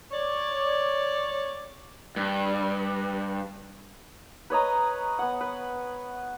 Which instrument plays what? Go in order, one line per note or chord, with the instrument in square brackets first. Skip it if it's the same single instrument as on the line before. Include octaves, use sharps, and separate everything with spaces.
[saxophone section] C#5 D5
[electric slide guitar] G2
[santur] B4 C#5 D#5 A#5
B3 F#5
B4